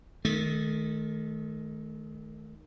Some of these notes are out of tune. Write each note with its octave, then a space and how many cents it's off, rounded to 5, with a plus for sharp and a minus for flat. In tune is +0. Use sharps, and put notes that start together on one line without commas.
D#3 +0 A3 -30